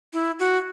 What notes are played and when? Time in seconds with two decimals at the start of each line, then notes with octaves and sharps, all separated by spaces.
0.13 E4
0.39 F#4